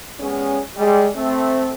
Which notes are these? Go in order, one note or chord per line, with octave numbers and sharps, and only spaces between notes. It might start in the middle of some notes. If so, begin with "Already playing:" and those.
G3 G#3 B3 C#4
G3 G#3
A3 C4